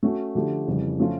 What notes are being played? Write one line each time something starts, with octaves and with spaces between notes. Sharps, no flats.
A3 C#4 F#4
D3 F3 A3 D4 G4
F2 C#3 E3 G3
F3 A3 C#4 F4